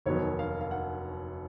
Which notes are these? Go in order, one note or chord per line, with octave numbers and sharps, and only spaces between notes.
F1 D#2 D#3 F#3 B3 C#5
F5
F5
F#5